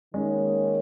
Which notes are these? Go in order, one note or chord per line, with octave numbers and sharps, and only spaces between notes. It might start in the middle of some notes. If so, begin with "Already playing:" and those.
D#3 G#3 A#3 C#4 D#4 G#4 C#5